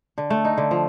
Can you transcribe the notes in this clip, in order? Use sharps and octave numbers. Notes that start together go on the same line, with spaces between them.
D3
A3
D#4
D3
F3